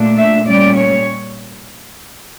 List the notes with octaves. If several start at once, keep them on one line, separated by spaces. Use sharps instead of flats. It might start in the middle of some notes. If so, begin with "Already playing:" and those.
Already playing: A#2 A3 D4
E5
A#2 G3 C#4 D5
C#5